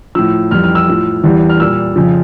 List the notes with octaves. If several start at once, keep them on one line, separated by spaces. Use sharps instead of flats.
A2 F3 E6
F2 E3 G3 F6
F6
E6
A2 F3
E2 E3 G3
F6
A#2 G3 E6
F2 C#3 F3